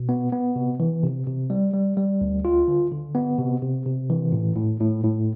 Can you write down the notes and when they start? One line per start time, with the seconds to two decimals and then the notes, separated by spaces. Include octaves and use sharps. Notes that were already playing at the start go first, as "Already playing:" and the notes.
Already playing: B2
0.09 B3
0.32 B3
0.56 C3
0.80 E3
1.03 C3
1.27 C3
1.50 G3
1.74 G3
1.97 G3
2.21 D2
2.45 F4
2.68 D3
2.92 D3
3.15 B3
3.38 C3
3.62 C3
3.86 C3
4.10 E3
4.32 A2
4.56 A2
4.80 A2
5.04 A2